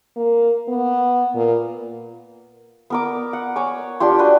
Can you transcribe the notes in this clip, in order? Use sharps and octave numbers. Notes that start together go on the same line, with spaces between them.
A#3
B3
A#2
B3 A#4 D6
F#5
C#5 G#5 D6
D4 F4 G4 C6
F#4 B4 G5